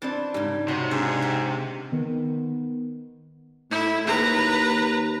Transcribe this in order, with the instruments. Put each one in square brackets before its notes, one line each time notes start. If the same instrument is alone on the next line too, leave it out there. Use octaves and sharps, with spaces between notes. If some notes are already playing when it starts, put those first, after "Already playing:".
[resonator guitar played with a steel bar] E3 C4 D4 [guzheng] A5
[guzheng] G#2 C#3 [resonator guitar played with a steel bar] G3
[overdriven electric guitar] C3 [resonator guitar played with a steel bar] D#4 F#4 C#5
[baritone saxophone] G#2 [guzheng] D4
[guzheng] C#4
[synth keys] D#3 B3
[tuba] A2 [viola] E4
[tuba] D#2 [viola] B4 A#5